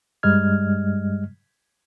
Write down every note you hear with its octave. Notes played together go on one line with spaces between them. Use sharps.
G2 G3 G#3 D#5 F6 G#6